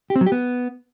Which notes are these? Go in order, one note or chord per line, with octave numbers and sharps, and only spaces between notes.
G4
C4
F#3
G4
B3